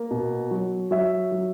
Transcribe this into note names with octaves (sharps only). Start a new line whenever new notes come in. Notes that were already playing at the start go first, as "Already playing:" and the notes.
Already playing: A#3
B2
F#3
F#3 E5
F#3